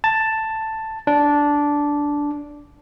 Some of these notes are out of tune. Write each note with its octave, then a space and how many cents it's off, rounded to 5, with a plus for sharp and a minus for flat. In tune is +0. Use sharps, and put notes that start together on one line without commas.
A5 +5
D4 -10